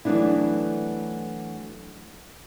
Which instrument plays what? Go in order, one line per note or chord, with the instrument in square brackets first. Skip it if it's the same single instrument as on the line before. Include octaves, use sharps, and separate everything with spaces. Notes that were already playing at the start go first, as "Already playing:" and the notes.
[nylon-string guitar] E3 F#3 A3 B3 D4 E4